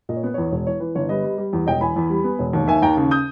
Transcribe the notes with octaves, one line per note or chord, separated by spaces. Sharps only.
A#2 D#5
C#5
B3 B4
E2 C#5
E1
E3 C#5
E3 B4
G1 C#5
G3 B4 D#5
G3
G3
E2
E1 D#5 G5
E2 G#5 B5
E2
G3
B3
E1
D#2
D#3 E5 G#5
D#2 G5 A#5
C#3
D#6 G6